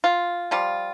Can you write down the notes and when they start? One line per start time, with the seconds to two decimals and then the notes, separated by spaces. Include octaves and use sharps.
0.04 F4
0.51 F3 G3 F4